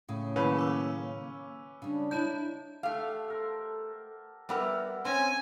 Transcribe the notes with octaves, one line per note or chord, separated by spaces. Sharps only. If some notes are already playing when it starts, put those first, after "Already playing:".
A2 C#3
D#3 F#3 A#3 C#4 E4 B4
D6 E6
C#3 G3 D4
D#4 E4 C#5 A5 G6
A3 G4 A4 F5 F#5
A4 A#4 C5
G3 B3 A#4 D5 E5 G5
C4 C#4 G#5